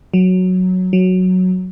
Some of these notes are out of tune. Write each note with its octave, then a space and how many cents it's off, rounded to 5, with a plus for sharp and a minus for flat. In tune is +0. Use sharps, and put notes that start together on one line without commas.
F#3 -5
F#3 -5